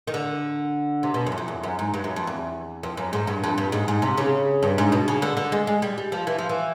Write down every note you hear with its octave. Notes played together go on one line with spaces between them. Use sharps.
D#3
D3
C3
B2
F#2
E2
F2
E2
F#2
G#2
G2
F#2
F2
E2
F2
F#2
G#2
G2
F2
G2
G#2
G#2
C3
C#3
G2
G#2
B2
C#3
D3
D3
G#3
G#3
G3
G3
F3
E3
F3
E3